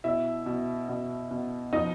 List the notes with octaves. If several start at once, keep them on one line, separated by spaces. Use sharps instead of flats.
B2 E4 E5
B2
B2
B2
F3 D#4 D#5